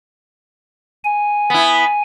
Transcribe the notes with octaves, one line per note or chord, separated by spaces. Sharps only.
G#5
B3 E4